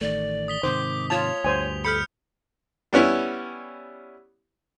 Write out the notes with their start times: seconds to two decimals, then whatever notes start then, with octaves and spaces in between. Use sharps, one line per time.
0.01 A1 D#3 A3 D5
0.48 D#6 B6 G7
0.63 G#2 C3 D#3 C5 D6
1.10 F4 C#5 A5 F7
1.44 D2 G2 C5 G#5
1.85 A4 B5 F6 G6 C#7
2.93 G3 B3 C#4 E4